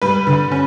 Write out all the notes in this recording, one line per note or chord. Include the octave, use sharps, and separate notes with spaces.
G3 B4
D3
C#4